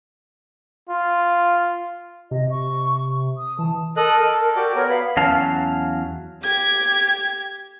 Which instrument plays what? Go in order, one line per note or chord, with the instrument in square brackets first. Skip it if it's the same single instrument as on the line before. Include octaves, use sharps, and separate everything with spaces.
[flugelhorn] F4
[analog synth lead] C3 [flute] D#5
[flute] C#6
D#6
[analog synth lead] E3 [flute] A5
[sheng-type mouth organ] A4 D#5 F#6 [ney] A#4
[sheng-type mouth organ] A4
F#4 G4 D5
[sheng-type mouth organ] B3 A#4 [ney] C#5
[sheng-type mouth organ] B3 B5 [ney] F5
[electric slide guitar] E2 F#3 C#4 F5 A5
[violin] G4 G#6